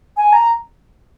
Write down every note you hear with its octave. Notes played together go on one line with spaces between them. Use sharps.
G#5
A#5